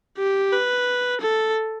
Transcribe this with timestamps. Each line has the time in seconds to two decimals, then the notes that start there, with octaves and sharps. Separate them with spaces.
0.18 G4
0.52 B4
1.21 A4